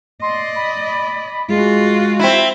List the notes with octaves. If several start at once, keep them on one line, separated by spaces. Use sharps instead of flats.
D5 D#5 C6
B5
G#3 F4 F#4
C4 E4